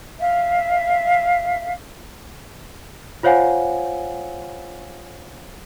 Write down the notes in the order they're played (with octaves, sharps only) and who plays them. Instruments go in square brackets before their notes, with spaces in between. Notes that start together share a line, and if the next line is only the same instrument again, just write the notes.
[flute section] E5 F5
[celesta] F4 C5 C#5 F5 F#5 G#5